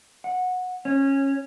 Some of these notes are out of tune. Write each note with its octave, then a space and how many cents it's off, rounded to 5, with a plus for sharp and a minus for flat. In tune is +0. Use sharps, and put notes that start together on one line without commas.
F#5 -15
C#4 -20